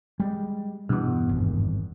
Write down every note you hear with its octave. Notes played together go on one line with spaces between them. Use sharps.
G3 G#3
E2 G2 B2 B3
G#1